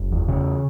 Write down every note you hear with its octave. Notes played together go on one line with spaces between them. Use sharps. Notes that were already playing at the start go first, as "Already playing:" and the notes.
Already playing: F#1
E2
C#3